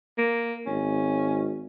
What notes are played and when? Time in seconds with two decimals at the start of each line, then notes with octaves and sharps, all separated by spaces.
0.18 A#3
0.66 G#1 C#4